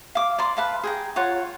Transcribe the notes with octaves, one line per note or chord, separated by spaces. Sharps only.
F5 D6
D5 A#5 C6 D6
B4 F5 A5
G#4 G5 A#5
F4 C#5 F#5 A#5